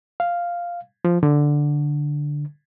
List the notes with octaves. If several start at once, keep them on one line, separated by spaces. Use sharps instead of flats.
F5
F3
D3